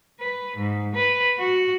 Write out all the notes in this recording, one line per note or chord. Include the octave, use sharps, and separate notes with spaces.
B4
G#2
B4
F#4